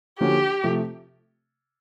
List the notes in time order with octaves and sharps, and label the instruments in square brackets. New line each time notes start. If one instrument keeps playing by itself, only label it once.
[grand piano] D3 F3 A#3 C#4 F#4 [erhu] G4
[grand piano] C3 F3 A3